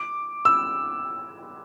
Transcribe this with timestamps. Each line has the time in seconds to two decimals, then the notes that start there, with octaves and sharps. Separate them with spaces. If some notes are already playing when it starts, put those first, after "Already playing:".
Already playing: D6
0.45 E6